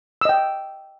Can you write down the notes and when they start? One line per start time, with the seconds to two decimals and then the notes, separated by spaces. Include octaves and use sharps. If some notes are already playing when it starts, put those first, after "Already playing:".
0.21 E6
0.25 D#5
0.29 G5